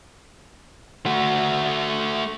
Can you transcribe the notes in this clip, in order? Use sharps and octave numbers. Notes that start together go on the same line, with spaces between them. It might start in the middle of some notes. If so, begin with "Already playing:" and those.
A3 F#4